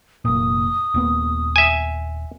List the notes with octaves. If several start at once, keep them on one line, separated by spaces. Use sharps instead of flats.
F1 A#2 D#6
D#1 A#3 B3
E5 G#5